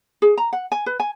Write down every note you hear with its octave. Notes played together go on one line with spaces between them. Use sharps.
G#4
A#5
F#5
G#5
B4
G#5